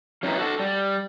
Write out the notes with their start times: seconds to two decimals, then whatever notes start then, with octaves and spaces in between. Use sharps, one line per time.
0.23 F#3 C#4 D#4 E4 G4 B4
0.38 F#4 A4
0.59 G3